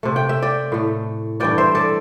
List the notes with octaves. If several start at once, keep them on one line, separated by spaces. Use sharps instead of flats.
C3 A3
G5
E5
D5 G5
A2 A3
G2 E3 A3 D5 G5
C5 E5
A4 D5